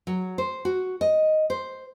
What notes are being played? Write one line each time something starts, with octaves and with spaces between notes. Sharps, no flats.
F#3
C5
F#4
D#5
C5